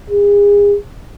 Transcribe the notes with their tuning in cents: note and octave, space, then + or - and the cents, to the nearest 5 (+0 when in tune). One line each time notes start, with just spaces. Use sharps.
G#4 -35